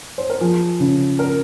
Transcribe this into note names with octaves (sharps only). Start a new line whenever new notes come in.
C5
A#4
F3 G#4
C#3
A#4